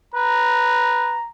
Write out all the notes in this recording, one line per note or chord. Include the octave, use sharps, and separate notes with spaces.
B4 A#5